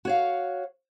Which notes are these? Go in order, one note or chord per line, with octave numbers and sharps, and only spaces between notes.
F#4 C#5 F5